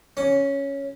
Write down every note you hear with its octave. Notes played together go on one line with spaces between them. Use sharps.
C#4